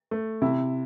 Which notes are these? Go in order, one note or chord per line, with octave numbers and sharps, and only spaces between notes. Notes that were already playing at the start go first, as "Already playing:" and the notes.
A3
C3 E4